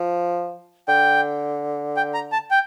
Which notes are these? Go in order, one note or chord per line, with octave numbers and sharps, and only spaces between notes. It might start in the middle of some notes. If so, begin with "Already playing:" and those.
Already playing: F3
D3 G5
G5
A#5
A5
G5